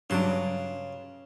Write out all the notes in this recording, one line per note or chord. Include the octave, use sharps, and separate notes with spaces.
G2 C#3 F#3 D4 C6